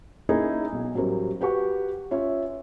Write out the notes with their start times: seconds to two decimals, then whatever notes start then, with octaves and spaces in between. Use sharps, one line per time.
0.29 A#3 C#4 D#4 E4 G#4 A#4
0.73 B1
0.95 A1 F#3 G3 A#4 C5
1.41 F#4 G4 B4 F#5 C#6
2.11 C#4 F4 C#5 E5